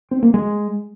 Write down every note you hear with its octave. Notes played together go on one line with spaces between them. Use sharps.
C4
A#3
G#3